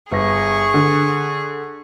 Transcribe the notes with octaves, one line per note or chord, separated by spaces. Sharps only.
G1 G#4 C#6 A#6
D3